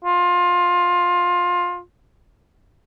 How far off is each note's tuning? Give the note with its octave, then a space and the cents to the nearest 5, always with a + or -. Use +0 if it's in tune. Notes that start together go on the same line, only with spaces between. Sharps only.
F4 +20